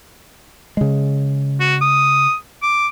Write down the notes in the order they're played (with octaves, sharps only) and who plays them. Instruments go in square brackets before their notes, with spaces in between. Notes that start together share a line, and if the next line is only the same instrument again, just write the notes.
[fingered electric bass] C#3 G#3
[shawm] F#4
D#6
D6